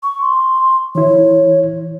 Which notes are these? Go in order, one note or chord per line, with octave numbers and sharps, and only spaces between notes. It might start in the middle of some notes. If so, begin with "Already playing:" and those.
C#6
C6
E3 E4 C#5